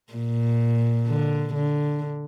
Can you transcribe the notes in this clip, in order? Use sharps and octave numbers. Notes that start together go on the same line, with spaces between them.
A#2
D3
D3